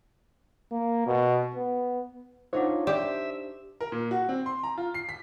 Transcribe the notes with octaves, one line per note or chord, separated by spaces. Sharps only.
A#3
B2
B3
D4 D#4 F4 C5 C#5 F#5
G4 C5 D5 E5 E6
A#4
A#2
F#4
C4
C6
A#5
F4
C7
B6